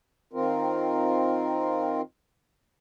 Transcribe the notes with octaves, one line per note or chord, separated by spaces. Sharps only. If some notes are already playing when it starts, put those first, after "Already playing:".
D#3 C4 F4 A#4